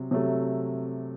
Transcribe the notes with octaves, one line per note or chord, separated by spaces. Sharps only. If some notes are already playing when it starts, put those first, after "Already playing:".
Already playing: C3 F#3
C3 F#3 A3